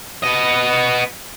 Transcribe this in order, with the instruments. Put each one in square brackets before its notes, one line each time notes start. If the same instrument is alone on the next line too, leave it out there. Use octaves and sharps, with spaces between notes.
[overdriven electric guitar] B3 D#5